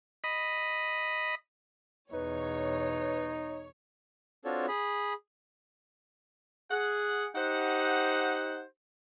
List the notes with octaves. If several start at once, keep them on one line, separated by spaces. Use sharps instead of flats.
D#5 B5
E2 B2 D#4 B4 C#5
C4 D4 F4 F#4 A4 C#5
G#4 B5
G#4 F#5
D#4 G4 C5 F#5